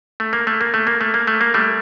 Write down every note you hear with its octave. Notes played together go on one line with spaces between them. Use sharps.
A3
A#3
A3
A#3
A3
A#3
A3
A#3
A3
A#3
G3 A3